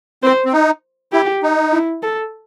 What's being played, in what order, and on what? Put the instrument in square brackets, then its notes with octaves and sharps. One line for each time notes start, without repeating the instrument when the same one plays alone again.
[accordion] C4 [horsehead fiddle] C5
[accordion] C4
D#4
[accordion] E4 [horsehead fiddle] G4
[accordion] D#4
[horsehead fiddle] E4
A4